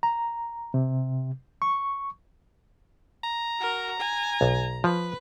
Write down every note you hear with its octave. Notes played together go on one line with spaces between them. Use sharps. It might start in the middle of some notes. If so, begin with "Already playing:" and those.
A#5
C3
C#6
A#5
F#4 A#4
G#5
B1
F3 B4